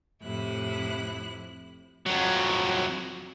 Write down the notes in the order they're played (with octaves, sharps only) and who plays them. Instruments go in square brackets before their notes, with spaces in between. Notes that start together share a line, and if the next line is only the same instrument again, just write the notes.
[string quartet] F2 A2 C3 E4 F#6
[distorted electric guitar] F2 F#3